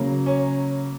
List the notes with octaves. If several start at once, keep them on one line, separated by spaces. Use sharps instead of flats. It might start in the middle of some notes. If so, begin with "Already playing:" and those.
Already playing: C#3 F#3 A#3
C#4